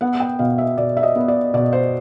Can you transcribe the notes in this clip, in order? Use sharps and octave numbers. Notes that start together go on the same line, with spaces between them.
B3 F#5
G5
B2 F5
E5
B2 D5
E5
D#5
B3
D5
B2 D5
C5